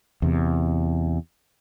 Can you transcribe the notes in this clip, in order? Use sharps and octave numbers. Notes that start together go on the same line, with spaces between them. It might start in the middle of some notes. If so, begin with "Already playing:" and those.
E2 C3